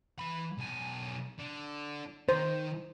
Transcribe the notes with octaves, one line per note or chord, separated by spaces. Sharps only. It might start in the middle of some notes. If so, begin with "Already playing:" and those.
E3 B5
B1 G#5
D3
D#3 D#4 C5